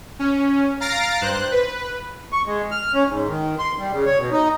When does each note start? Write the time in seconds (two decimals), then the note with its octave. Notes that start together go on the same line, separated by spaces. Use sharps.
0.19 C#4
0.80 F5 A#5 A6 A#6 C7 D7
1.21 G2 C5 F#6
1.52 B4
2.33 C#6
2.47 G#3
2.71 F6
2.94 C#4
3.08 G#2
3.27 D#3
3.59 C6
3.79 G3
3.93 C#3
4.06 C#5
4.18 B2
4.32 D#4